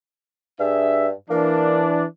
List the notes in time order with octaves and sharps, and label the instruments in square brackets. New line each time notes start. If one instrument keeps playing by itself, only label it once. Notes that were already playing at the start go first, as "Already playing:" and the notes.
[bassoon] G2 [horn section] D4 G#4 E5
[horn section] E3 D4 [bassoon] A#3